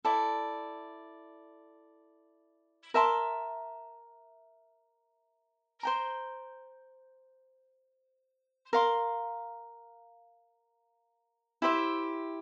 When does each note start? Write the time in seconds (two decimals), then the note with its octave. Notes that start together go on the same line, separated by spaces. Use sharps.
0.05 E4 A4 D5
2.94 A#4 E5 A5 C6
5.83 C5 G5 A#5
8.73 A#4 F5 C6
11.62 E4 G4 C5 E5